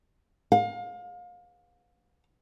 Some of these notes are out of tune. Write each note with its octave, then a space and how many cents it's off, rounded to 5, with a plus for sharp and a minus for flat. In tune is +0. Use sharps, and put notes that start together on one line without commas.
F5 +30